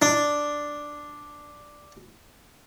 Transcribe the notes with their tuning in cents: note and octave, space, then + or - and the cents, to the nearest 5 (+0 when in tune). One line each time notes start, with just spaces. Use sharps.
D4 +0